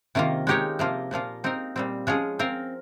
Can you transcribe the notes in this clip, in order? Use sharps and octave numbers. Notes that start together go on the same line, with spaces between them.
C3 D#3 A#3 F4
G#3 D#4 G4 A#4 C#5
C3 F3 A#3 F4
A#2 F3 A#3 F4
C4 D#4 A#4
A#2 G3 C4
F3 G#3 C#4 F4 G#4
C4 F4 A#4